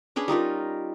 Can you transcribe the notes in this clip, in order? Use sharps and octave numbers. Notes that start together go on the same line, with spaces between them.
C#4 D4 G#4 B4
G3 D#4 F4 A#4